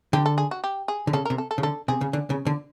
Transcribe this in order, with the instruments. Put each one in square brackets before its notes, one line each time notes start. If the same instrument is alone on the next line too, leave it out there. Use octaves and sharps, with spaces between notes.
[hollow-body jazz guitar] D3 [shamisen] G4
[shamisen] A4
G#4
F#4
G4
G#4
[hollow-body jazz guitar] D3
[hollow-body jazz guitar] C#3 [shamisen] A4
[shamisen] A#4
[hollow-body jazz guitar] C3
[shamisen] A4
A4
[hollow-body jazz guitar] C#3
[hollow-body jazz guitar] D3 [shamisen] A4
[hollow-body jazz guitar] C3 [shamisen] G#4
[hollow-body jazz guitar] C#3
D3
C#3
D3